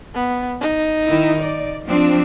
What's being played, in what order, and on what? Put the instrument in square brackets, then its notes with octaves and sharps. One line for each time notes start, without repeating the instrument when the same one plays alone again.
[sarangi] B3
D#4
[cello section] D#3 E4
D5
F3 C4 D4